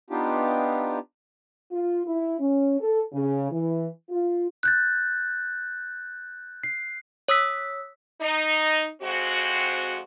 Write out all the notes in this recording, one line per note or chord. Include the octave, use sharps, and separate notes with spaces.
B3 D4 D#4 F4 G4
F4
E4
C#4
A4
C#3
E3
F4
F#6 G6 A6
C7
C#5 D#6 E6 B6
D#4
F2 G#3 C4 F#4